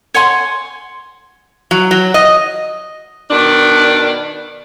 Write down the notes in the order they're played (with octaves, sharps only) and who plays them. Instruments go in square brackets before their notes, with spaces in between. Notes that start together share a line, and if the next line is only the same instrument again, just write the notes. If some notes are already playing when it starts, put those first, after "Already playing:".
[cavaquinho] C#5 F#5 G#5 C6
[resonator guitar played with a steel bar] F#3
F#3
D#5
[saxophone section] B2 D#3 D4